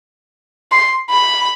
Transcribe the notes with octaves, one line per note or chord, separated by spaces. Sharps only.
C6
B5